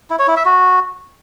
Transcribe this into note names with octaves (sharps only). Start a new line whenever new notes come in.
E4
C#5
E4
E5
F#4